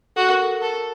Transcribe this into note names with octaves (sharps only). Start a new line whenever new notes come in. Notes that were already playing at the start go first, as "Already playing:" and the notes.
F#4 A4
A#4
A4
A4 A#4